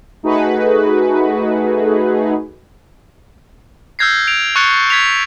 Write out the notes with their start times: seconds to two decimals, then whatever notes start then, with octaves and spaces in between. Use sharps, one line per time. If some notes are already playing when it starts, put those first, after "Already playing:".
0.23 A3 D#4 F#4 G#4 B4
3.99 E6 F6 G6 G#6 A#6 C7
4.27 D7 F7
4.56 C#6 F#6 A6 C#7 G7
4.75 A6
4.90 G#6 B6 F7